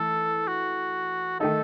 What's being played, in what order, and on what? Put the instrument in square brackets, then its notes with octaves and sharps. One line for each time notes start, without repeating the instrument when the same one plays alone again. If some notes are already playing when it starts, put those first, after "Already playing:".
Already playing: [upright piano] E3 A3 [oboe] A4
[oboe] F#4
[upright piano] D#3 A3 D#4 [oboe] A4